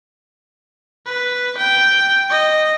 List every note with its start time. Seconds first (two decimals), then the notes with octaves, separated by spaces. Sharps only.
1.06 B4
1.58 G5
2.30 D#5